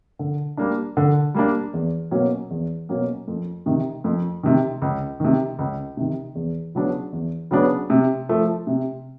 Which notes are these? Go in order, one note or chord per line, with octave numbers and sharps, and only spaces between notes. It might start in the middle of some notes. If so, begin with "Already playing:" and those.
D3
G3 A#3 D4
D3
G3 A#3 D4
E2
B2 F#3 A#3 C#4
E2
B2 F#3 A#3 C#4
F2
C3 D#3
F2
C3 D#3
C#2
C3 D#3
C#2
C3 D#3
E2
C#3 F#3 B3 D4
E2
C#3 F#3 B3 D4
C3
F3 A3
C3